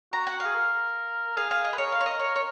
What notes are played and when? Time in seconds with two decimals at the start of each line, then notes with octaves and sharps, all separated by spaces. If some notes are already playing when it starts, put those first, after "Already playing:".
0.13 F#4 A#5
0.27 F#5
0.40 F5
0.45 G#4
0.54 A#4
1.37 G#4 F5
1.51 F5
1.65 D#5
1.73 B4
1.78 A#4 C#5
1.92 F5
2.01 C#5
2.06 D#5
2.19 C#5
2.36 C#5